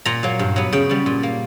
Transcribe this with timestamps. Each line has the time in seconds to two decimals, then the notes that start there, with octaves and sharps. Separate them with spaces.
0.05 A#2 A#5
0.23 F#3 A#3
0.39 G2
0.56 F#3 B3
0.72 C#3 G5
0.89 G3 B3
1.06 A#2
1.23 A#3